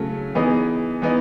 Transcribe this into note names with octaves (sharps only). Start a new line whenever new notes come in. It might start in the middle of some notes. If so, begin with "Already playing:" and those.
Already playing: C#3 F#3 A3
E3 B3 D#4 G#4
E3 B3 D#4